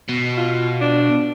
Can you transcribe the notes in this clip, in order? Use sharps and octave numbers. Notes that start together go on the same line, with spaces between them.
B2
F4
D4